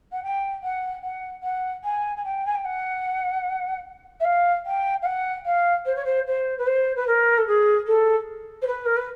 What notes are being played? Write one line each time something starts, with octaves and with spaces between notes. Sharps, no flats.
F#5
G5
F#5
F#5
F#5
G#5
G#5
G5
G#5
G5
F#5
E5
F5
G5
F5
F#5
F5
C5
C#5
C5
C5
B4
C5
B4
A#4
A4
G#4
A4
C5
B4
A#4
B4